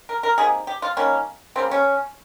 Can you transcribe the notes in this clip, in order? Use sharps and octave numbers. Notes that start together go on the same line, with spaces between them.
A#4
A#4
C3 D#3 A#3 G#4
G4
F4
D#3 G3 A#3 C#4
C#3 G3 A#3 C4
C#4